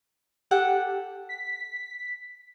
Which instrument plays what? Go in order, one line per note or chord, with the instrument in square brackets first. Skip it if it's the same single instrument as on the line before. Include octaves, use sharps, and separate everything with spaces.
[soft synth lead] G4 [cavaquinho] A4 F#5 G5
[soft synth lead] B6